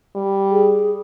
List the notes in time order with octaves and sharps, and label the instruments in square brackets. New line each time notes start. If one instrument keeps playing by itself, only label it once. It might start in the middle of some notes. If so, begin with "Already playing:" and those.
[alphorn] G3
[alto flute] G#4